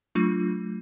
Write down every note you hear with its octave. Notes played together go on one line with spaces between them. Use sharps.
F#3 A3 D4 F4 C#6